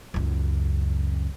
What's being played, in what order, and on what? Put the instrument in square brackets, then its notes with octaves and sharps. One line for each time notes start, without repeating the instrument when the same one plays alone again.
[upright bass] C#2 F#2